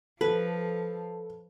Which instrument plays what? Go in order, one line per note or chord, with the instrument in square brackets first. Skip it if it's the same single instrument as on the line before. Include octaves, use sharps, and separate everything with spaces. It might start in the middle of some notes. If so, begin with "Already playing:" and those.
[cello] F3 [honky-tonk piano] A4 [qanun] B4